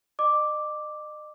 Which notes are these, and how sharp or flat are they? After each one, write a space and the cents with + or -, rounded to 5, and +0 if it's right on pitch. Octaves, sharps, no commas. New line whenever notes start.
D#5 -40 D6 +0